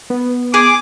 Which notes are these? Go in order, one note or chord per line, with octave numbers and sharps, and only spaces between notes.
B3
G#4 D6